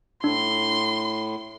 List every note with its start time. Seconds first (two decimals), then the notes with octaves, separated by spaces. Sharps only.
0.24 A2 D4 C6